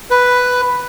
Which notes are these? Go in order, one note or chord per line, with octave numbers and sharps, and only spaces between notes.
B4